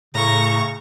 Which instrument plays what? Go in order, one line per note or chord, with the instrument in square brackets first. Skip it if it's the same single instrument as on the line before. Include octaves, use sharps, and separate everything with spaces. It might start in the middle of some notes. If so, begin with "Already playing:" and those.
[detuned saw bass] A2 [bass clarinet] C#3 [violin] A#5 C#6